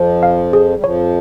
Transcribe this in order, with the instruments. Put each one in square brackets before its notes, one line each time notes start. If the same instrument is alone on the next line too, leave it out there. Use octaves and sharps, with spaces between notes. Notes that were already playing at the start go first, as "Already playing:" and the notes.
Already playing: [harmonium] F2 F3 [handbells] C5
[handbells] F5
G#4
[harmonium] G3
[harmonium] F2 F3 [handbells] C#5